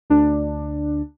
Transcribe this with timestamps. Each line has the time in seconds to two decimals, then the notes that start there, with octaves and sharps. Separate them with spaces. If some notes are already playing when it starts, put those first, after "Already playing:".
0.10 D2 D4